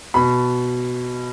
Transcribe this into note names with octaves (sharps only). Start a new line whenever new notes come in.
B2 B5